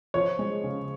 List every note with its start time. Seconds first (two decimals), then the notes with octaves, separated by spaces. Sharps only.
0.14 F3 C#5
0.39 G#3
0.64 C#3